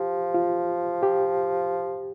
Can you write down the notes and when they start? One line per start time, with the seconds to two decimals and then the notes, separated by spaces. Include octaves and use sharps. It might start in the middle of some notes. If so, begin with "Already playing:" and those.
Already playing: F3 G4
0.34 F4
1.03 G4